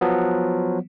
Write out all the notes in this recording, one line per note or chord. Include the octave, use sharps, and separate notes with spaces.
F3 F#3 B3